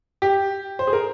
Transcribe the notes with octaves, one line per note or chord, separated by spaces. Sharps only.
G4
C5
G#4
A#4